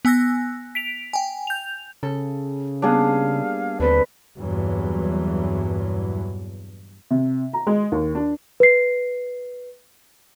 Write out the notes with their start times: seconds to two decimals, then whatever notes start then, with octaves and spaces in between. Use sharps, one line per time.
0.05 B3 G#5 E6 F#6 A#6
0.75 B6 D7 F7
1.13 G5 G#5
1.47 G6 F7
2.03 C#3 A4
2.82 G3 A#3 B3 D4 G#4 F5
3.80 D#2 D3 C4 A4 B4
4.37 E2 G2 A#2 E3 F#3
7.10 C3
7.53 A#5
7.67 G#3
7.92 D#2
8.15 D4
8.60 B4 C7